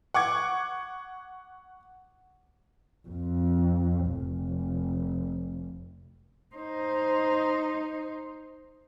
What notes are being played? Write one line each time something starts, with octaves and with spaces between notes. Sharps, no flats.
F#5 C#6 D6 G#6
F2
F1
D#4 C5